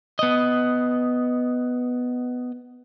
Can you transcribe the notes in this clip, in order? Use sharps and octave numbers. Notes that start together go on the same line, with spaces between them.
B3 D#5